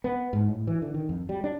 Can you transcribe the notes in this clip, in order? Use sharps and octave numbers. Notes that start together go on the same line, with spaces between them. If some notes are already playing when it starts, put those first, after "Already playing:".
B3
G#2
A2
E3
D3
D#3
F2
G3
D4